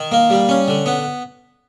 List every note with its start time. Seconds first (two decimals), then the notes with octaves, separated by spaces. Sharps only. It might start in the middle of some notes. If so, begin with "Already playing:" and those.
Already playing: D#3
0.12 A#3
0.30 G3
0.49 C#4
0.68 D3
0.86 B3